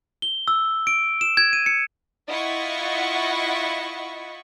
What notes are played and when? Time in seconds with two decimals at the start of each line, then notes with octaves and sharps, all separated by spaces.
0.22 G7
0.48 E6
0.87 D7
1.21 E7
1.37 G#6
1.53 D#7
1.66 C#7
2.28 E4 F4 D#5 F#5 B5 C#6